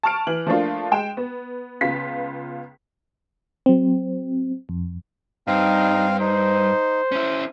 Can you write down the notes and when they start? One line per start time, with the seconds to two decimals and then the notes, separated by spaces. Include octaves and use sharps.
0.03 A5 C#6 F6 D7
0.27 E3 F#7
0.47 F3 A3 A#3 D4 F4
0.92 G#3 G5 E7
1.17 B3
1.81 C#2 C#3 B3 F4 B6
3.66 F#3 C4
4.69 F2
5.47 G2 C4 D#4 F5
6.20 D#4 C5
7.12 C#4 E4